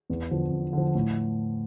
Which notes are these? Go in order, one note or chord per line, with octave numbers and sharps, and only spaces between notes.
E2
D3 F3
E2
D3 F3
A2